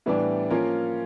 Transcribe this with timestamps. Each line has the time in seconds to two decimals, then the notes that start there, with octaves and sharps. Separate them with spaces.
0.06 A2 E3 G3 B3 D4
0.50 F3 A#3 C#4 F4 A#4